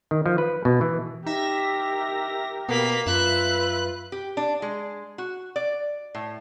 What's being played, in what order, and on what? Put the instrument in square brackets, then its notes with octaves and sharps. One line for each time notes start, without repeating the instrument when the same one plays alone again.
[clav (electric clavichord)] D#3
F3
B4
B2
E3
[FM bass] D#4 [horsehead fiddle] G4 A#4 [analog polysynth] E5 A#6
[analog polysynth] B2 [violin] A#3 B6 [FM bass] B3
[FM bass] F#2 [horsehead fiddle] F4 B4 [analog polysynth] E5 [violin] F#6
[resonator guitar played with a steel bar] G4
D4
G#3
F#4
D5
A2